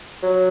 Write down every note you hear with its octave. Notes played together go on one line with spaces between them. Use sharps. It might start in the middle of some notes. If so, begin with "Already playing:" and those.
F#3